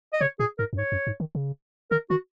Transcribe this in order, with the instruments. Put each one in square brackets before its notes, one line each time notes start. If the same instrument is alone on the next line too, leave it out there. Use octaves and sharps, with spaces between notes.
[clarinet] D#5
[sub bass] C#3 [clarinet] C#5
[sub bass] A#2 [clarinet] G#4
[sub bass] G#2 [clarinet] A#4
[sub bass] F#2
[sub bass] G#2 [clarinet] C#5
[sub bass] F#2
G#2
D#3
C#3
[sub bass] D#3 [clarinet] A#4
[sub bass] D#3 [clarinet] F#4